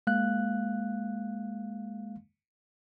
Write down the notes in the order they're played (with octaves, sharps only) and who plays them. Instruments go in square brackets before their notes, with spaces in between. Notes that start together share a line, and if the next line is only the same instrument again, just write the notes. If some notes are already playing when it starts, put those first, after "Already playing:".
[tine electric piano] G#3 A#3 F5 F#6